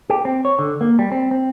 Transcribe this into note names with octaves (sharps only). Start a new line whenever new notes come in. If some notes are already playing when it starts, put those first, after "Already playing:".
G4
C4
C#5
D3
A#3
G3
C4
C4